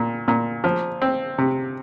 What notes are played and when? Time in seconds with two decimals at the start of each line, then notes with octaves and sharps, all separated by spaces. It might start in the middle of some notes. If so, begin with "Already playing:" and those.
Already playing: A#2
0.28 A#2
0.64 F3
1.02 C4
1.38 C3